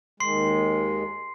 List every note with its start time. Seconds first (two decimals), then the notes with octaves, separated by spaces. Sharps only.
0.20 D#2 D#3 G#3 C6 C7